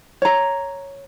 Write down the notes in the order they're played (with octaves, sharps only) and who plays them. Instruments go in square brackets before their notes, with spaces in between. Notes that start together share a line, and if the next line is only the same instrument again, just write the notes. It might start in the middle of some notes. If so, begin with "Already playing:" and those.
[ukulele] C#5 A#5